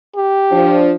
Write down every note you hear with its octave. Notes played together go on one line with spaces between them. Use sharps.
G4
F3 D4